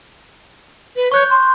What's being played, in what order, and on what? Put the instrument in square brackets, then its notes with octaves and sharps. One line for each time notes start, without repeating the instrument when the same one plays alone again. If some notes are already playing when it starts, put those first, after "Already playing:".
[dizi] B4
[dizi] C#5 [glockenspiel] C#6 F#6 G6
[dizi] C6